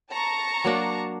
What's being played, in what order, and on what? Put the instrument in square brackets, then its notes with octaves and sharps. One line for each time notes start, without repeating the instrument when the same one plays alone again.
[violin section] A5 A#5 C#6
[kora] F#3 A#3 D4